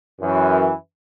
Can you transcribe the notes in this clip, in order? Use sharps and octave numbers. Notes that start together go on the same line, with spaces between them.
F#2 E3